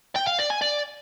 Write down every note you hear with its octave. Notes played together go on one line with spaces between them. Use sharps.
G5
F5
D5
G#5
D5